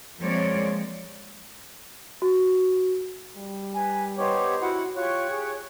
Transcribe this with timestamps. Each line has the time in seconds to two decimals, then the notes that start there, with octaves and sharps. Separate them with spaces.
0.19 F3 G#3 A#3 C4 C#5 D5
2.22 F#4
3.36 G3
3.74 B4 G#5
4.18 B3 D#4 G4 C5 C#5
4.62 E4 F#4 F#5
4.96 F4 G4 C#5 C#6 F#6
5.31 G#4